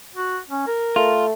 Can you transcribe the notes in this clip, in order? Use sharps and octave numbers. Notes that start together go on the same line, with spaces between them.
F#4
C#4
A#4
A3 F4